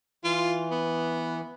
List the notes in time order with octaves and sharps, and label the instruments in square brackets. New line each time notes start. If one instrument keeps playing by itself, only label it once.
[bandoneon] E3 [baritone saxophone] F4
[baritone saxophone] B3